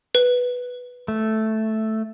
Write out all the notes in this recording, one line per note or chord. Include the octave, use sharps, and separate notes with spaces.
B4
A3